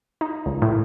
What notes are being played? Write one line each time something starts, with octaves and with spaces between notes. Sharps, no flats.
D#4
C#2
A2